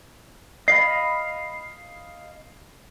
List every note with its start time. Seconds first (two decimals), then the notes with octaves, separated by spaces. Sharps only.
0.68 D#5 F5 B5 C7